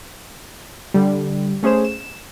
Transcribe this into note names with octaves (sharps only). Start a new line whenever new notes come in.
D3 G3
A3 C#4 G#4 C5 E7
E7